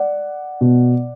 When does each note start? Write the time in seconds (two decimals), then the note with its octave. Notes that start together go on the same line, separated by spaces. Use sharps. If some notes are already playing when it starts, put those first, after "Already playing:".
Already playing: D5 F#5
0.61 B2